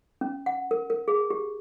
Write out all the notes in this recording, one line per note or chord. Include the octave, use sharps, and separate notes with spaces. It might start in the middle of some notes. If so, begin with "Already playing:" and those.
C#4
F#5
A#4
A#4
G#4
G4